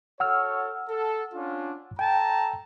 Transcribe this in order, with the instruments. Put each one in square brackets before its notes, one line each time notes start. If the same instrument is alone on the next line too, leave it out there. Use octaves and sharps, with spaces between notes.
[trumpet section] F#4 A4 C#5 [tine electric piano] F#5 E6 F6
[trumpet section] A4
C#4 D4 F4
[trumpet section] A4 A5 A#5 [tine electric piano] G5